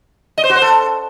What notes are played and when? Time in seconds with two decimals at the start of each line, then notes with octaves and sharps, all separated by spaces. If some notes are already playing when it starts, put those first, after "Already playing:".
0.38 D#5
0.44 C5
0.50 F#4
0.56 C5
0.62 A4